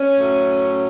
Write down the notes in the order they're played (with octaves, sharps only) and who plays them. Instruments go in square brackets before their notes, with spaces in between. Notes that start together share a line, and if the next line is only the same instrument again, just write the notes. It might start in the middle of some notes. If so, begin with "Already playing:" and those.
Already playing: [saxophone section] C#4
A2 F#3 A3